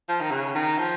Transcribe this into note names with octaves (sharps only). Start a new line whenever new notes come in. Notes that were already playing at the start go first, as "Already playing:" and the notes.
F3
D#3
C#3
D#3
F3